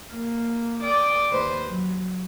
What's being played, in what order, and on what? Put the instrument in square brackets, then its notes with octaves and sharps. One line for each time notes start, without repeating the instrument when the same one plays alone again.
[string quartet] A#3
D5 G5 D#6
D#2 B4 C5 D#5
F#3